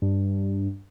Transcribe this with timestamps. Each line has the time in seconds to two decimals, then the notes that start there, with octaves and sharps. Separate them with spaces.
0.02 G2